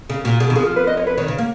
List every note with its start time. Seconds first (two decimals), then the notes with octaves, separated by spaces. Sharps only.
0.09 C#3 G#4
0.24 A#2 F#4
0.40 B2 G#4
0.50 D#3 F#4
0.56 F3 G#4
0.66 F4
0.76 B4
0.87 D#5
0.97 C#5
1.07 B4
1.17 D#3 C#5
1.28 C#3
1.38 A#3